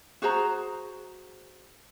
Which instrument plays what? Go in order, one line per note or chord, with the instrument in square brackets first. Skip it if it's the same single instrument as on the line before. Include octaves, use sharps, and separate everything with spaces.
[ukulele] F#4 G#4 C5 A#5